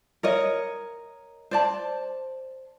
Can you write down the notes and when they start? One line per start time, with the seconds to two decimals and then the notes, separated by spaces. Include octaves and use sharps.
0.23 A#4 C#5 D#5
1.51 C5 D5 A5